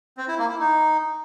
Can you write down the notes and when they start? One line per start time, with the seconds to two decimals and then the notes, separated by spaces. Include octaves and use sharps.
0.17 C4
0.28 E4
0.39 A#3
0.49 E4
0.60 D#4